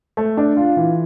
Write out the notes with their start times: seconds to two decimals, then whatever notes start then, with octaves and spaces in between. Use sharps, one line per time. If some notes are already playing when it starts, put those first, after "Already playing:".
0.17 A3
0.37 D4
0.57 F4
0.77 E3